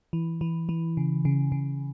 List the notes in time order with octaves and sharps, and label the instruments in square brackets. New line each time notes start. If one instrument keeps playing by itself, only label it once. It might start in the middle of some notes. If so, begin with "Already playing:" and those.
[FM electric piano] E3
E3
E3
C#3
C#3
C#3